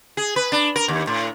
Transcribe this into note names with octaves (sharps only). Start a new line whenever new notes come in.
G#4
B4
D4
A#4
D#2
A2